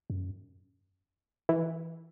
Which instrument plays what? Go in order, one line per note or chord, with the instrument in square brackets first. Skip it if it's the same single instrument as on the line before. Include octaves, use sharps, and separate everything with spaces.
[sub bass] F#2
[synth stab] E3